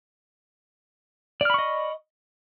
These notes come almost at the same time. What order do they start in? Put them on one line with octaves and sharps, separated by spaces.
D5 F6 B5 C#6 D#5